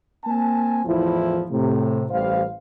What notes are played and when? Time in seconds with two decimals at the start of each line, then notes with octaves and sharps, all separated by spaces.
0.25 A#3 C4 G#5 A5
0.85 E2 A2 F3 E4
1.50 A2 C3
2.10 A1 G3 C5 F5